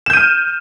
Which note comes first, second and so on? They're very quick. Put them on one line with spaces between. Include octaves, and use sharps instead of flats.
E7 G6 D#7 F6